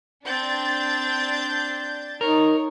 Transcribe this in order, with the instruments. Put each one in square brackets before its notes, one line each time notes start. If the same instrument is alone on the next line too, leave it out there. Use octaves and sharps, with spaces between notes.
[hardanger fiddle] C4 [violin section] D4 G6 A6
[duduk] D#4 [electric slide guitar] A#4 [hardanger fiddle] C#5